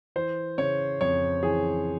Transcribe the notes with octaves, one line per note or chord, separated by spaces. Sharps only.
E3 C5
C#3 C#5
F2 C#5
E3 G#4